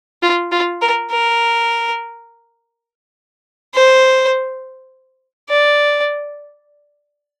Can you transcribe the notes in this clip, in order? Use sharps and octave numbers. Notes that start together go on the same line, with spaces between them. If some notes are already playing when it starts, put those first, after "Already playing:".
F4
F4
A#4
A#4
C5
D5